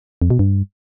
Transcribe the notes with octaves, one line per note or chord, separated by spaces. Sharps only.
F2
B2
G2